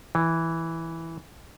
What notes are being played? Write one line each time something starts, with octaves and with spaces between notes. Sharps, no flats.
E3